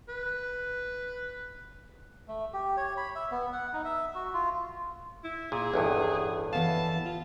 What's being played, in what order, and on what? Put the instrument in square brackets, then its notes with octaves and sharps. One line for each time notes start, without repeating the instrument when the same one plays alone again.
[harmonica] B4
[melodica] A3
G4
C#5
B5
E5
B3
F#5
D#4
E5
F#4
F4
[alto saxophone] E4
[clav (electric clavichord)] A#2 [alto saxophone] G#4
[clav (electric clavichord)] A1 E2 G2
[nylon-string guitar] E3 B3 F5 [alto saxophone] A5
[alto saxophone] F4